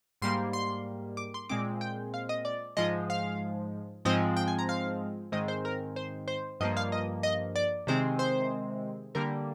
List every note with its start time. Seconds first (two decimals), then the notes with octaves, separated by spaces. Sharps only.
0.22 G#2 G3 A#3 C6
0.53 C6
1.17 D6
1.34 C6
1.49 A#2 G#3 C4 D6
1.81 G5
2.14 F5
2.29 D#5
2.45 D5
2.77 G#2 F3 G#3 D#5
3.10 F5
4.05 G#2 F3 G#3 C4 D#5
4.37 G5
4.48 G#5
4.59 A#5
4.69 F5
5.32 G#2 D#3 G#3 C4 D#5
5.48 C5
5.65 A#4
5.96 C5
6.28 C5
6.60 G2 F3 A#3 D#5
6.77 F5
6.92 D#5
7.23 D#5
7.56 D5
7.87 C3 D#3 G#3 C4 C5
8.19 C5
9.15 D3 G3 A#3 A#4